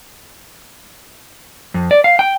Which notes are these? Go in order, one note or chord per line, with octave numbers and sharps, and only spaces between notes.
F2
D5
F5
G5